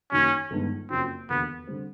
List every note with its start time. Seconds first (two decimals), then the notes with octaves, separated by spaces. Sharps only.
0.12 F#2 D#3 F#3 A#3 C#4
0.51 G1 G2 D#3 G#3 B3
0.90 F#1 F2 C#3 F#3 C4
1.29 E1 D#2 D3 B3
1.67 D3 G3 C4